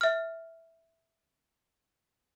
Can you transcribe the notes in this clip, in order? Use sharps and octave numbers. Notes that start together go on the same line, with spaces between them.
E5 F6